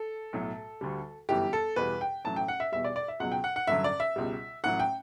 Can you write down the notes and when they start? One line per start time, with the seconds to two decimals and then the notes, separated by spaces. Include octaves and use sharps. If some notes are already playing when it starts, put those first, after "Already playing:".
Already playing: A4
0.33 B1 A2 F#3
0.81 D2 D3 G3
1.29 G1 F#2 E3 G3 G4
1.53 A4
1.76 E2 B2 G3 B4
2.01 G5
2.25 A1 A2 F#3 A5
2.36 G5
2.48 F#5
2.60 E5
2.72 E2 B2 G3 E5
2.84 D5
2.96 D5
3.08 E5
3.20 C#2 B2 F#3 F#5
3.32 G5
3.44 F#5
3.56 F#5
3.67 A1 G2 D3 F#3 E5
3.84 D5
4.00 E5
4.16 C#2 B2 G3
4.64 A1 A2 F#3 F#5
4.79 G5